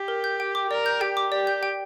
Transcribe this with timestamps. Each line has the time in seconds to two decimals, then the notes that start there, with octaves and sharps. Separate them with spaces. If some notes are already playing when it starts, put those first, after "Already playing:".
Already playing: G4
0.08 A#4
0.24 G6
0.40 G5
0.55 D6
0.70 A#4 D5
0.86 G6
1.01 G4 G5
1.17 D6
1.32 G4 D5
1.47 G6
1.63 G5